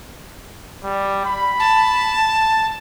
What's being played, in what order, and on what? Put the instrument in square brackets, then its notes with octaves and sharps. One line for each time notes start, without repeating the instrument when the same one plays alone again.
[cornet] G3
B5
[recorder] A5